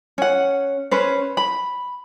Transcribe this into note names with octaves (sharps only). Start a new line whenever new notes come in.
C#4 F#5
C#4 B4 C5
B5